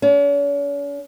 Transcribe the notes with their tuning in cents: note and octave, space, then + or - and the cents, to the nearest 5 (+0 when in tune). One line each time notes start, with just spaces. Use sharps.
C#4 +45